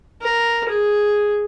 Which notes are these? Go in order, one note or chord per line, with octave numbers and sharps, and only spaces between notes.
A#4
G#4